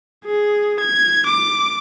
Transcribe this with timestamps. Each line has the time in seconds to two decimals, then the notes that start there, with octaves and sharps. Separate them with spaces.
0.25 G#4
0.80 G#6
1.27 D6